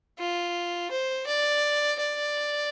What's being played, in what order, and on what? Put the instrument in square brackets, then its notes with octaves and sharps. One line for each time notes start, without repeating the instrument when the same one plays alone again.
[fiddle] F4
C5
D5
D5